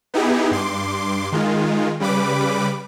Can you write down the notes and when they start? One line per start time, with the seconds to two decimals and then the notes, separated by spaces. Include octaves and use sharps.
0.14 B3 D#4 E4 G4 G#4
0.51 G2 C6 D6
1.32 D#3 G#3 F4
2.00 C#3 G3 B4 B5 D6